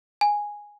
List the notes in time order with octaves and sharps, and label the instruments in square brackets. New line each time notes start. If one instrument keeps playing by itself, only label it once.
[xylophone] G#5